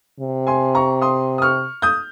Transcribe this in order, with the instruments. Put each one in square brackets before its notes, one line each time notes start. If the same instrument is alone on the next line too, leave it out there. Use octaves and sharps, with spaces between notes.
[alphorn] C3
[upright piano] G#5 C6
A#5 C#6
C6 D#6
D#6
C#6 F6
D#6 G6